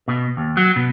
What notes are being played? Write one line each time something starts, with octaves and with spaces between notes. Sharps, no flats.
B2
D#2
F#3
B2